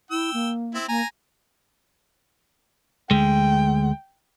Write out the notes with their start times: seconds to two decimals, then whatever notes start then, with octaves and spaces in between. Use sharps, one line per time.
0.11 E4 G5 E6
0.34 A#3
0.74 C4 E4
0.88 A#3 G#5 A#5
3.11 D2 G#3 G5